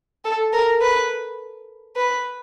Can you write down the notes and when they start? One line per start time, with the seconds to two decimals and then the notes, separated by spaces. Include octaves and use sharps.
0.25 A4
0.53 A#4
0.81 B4
1.96 B4